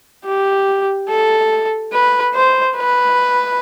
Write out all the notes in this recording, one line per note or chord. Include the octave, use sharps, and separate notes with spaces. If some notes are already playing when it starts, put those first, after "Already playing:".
G4
A4
B4
C5
B4